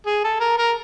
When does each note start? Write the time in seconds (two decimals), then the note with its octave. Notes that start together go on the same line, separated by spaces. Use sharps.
0.06 G#4
0.24 A4
0.40 A#4
0.57 A#4